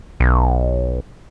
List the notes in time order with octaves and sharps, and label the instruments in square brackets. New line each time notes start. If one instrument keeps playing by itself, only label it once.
[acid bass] B1